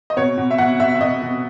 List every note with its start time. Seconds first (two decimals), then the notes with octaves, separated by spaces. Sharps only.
0.10 D#5
0.17 B2 C#5
0.37 B2
0.51 E5
0.58 B2 F#5
0.80 B2 E5
0.95 E5
1.01 B2 D#5
1.22 B2